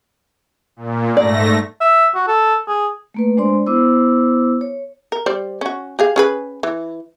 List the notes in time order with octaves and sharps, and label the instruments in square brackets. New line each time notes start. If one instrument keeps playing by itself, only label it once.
[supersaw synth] A#2
[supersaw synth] G#2 A3 A#6 [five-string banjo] D5
[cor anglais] E5
F#4
A4
G#4
[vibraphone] A3 A#3 B4
G#3 D4 C5 D5 C6
B3 E4 C5 D6 E6
C#5
[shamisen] A#4
G3 C5 D5
C#4 F#4
G4 G#4 F5
C#4 G#4 B4
E3